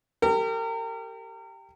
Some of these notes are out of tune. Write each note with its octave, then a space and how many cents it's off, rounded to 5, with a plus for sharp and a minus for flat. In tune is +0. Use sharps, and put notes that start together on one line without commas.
G4 +0 A#4 -35